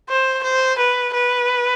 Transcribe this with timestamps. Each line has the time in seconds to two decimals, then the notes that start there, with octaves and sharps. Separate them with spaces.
0.09 C5
0.43 C5
0.78 B4
1.14 B4